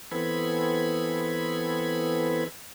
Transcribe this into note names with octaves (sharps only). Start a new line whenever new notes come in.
E3 B3 C4 A4 B5 G#6